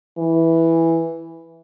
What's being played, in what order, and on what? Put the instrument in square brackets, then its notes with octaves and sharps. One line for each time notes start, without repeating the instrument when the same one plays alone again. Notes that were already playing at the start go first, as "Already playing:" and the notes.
[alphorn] E3